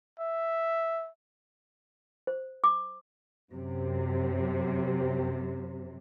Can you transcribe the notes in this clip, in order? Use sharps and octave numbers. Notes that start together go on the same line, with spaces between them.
E5
C5
D6
F#2 C3